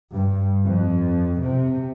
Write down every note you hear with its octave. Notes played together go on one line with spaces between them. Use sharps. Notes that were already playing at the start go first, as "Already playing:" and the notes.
G2
F2
C3